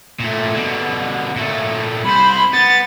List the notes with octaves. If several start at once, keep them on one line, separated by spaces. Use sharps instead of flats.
A#2 A3
B2 D3
A#2 A3
C2 C5 B5
B3 A6